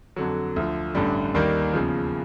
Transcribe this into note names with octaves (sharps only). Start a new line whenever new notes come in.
F2 D3 F#3
D2 D3 F3
A1 G2 D3 G3
D#2 D#3 G3 A#3
E2 C#3 F3